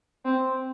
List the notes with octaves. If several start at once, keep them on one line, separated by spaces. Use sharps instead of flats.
C4